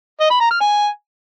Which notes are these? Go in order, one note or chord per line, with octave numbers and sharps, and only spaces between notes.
D#5
B5
A#5
F6
G#5